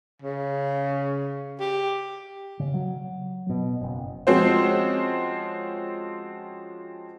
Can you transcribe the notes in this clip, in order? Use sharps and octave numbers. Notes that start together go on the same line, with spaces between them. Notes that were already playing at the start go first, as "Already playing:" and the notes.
C#3
G4
C#3
F#3
B2
F#1
F3 G#3 C4 C#4 F#4 C5